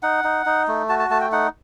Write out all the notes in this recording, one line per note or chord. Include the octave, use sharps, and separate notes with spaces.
D#4 F#5
D#4
D#4
A3
F#4 A5
A5
A3 A5
G5
D#4 F#5